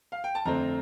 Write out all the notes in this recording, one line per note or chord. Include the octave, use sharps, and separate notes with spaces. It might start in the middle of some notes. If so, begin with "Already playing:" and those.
F5
G5
A5
F2 D3 A3 C4 A#5